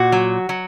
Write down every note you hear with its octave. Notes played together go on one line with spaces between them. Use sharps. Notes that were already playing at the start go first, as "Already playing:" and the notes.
Already playing: A#2 F#4
F#3
F#3